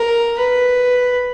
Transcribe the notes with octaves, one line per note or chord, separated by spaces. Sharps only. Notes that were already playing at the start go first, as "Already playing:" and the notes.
Already playing: A#4
B4